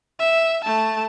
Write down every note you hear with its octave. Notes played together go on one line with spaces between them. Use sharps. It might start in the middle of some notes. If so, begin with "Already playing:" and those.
E5
A3 A5